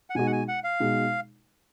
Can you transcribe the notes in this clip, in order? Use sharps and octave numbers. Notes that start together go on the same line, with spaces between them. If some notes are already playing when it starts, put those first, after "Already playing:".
F#5
B2 G#3 D#4 F#4 G#5
F#5
G#5
F#5
F5
B2 G#3 D#4 F#4